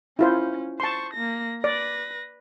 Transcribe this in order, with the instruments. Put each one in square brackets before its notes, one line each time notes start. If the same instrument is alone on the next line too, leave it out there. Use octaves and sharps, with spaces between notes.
[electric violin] C#4 [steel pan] E4 F4 C5
[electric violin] C5 C#6 [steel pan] A5 C6
[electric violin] A#3 A#6
[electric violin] B4 A#6 [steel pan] D5